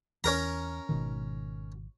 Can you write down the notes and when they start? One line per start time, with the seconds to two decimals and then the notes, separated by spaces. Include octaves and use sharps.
0.24 E2 C#4 A#4 A#5
0.89 G#1 B2 D#3